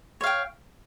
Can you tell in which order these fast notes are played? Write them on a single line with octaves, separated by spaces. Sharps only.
C#5 F5 G5